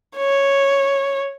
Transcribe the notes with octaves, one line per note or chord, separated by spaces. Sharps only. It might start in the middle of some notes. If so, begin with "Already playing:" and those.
C#5